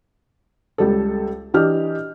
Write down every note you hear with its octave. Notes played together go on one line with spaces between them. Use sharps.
C#2 G3 A4
E3 D4 G4 D#5 F6